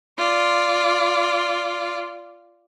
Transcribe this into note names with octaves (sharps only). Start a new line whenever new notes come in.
F4 D5